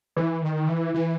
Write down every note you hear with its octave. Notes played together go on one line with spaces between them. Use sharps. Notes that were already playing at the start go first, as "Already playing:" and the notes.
E3
D#3
E3
E3